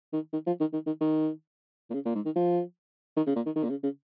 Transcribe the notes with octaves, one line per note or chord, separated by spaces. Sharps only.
D#3
D#3
F3
D#3
D#3
D#3
D#3
A#2
C#3
A#2
G#2
D#3
F3
D#3
C#3
A#2
D#3
D#3
A#2
C#3
C#3